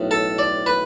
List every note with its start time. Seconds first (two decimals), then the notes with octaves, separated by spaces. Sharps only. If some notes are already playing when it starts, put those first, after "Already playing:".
Already playing: B1 A2
0.11 A4
0.39 D5
0.66 B4